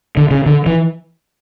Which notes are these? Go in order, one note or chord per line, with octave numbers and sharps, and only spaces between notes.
D3
C#3
D3
E3